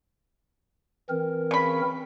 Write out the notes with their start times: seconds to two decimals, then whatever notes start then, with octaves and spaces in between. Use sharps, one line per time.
1.09 E3 C4 A#4
1.51 C#3 B5